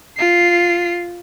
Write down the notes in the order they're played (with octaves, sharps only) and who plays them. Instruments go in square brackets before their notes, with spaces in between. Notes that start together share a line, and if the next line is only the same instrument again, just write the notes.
[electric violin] F4 C7